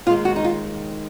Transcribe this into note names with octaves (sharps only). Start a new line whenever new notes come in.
D#2 D#3 G#3 F4
F#4
D#4
F4